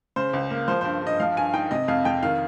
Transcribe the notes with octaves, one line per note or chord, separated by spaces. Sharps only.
C#3 C5
C#2
A#3
F3 C5
G2 C5
G2 D#5
F3 F5
G2 G#5
D#4 G5
C3 D#5
F2 F5
F2 G5
D#3 F5